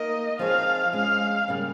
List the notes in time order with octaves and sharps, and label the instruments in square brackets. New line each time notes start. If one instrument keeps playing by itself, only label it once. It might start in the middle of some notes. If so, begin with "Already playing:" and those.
Already playing: [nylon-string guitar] A#3 D#4 A#4 [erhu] D#5
[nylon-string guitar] F3 C4 D#4 G#4 C#5 [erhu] F5
[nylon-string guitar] G#3 C#4 G#4 [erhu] F5
[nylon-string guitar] C#3 G3 A#3 C#4